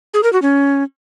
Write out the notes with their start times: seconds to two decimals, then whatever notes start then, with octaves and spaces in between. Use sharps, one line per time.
0.14 G#4
0.23 A#4
0.33 F#4
0.42 C#4